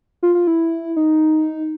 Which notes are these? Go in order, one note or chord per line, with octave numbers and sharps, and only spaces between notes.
F4
F4
E4
D#4